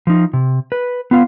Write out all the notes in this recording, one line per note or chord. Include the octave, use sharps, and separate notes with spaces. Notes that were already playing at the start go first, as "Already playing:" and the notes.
F3 D#4
C3
B4
B3 F4 F5